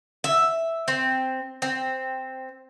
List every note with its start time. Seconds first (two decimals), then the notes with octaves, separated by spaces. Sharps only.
0.24 E5
0.88 C4
1.62 C4